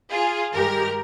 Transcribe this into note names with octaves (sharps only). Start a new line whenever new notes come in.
F4 G#4
G2 D#3 G#3 G4 A#4